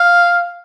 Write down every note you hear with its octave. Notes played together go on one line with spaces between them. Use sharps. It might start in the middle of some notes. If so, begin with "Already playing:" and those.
Already playing: F5